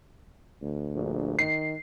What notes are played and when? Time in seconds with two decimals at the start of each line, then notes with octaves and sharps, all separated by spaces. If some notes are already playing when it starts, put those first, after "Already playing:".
0.62 D2
0.94 A#1
1.39 D#3 C7